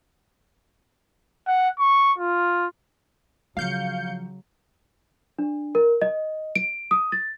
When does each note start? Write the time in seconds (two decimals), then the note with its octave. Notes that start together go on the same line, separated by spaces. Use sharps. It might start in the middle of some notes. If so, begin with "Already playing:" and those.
1.48 F#5
1.79 C#6
2.18 F4
3.57 C#3 F3 F#3 F5 G6 C#7
5.39 D4
5.75 A#4
6.02 D#5
6.56 D7
6.91 D#6
7.12 A6